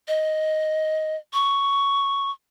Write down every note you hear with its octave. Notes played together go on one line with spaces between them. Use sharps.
D#5
C#6